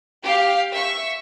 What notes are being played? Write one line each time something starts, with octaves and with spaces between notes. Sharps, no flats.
G4 F5
E5 C#6